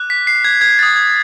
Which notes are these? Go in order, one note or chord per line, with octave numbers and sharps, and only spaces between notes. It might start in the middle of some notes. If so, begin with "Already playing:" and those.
Already playing: D6 F#6
B6
C7
G#6
G#6
D#6 F#6 A6
G#6